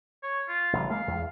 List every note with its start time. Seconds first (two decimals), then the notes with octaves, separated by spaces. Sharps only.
0.23 C#5
0.48 F4
0.73 A1 C#3 G3
0.90 G#3 A#3 F5
1.08 E2